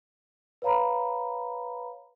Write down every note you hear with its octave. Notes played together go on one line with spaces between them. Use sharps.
B4 C#5 F5 A#5 B5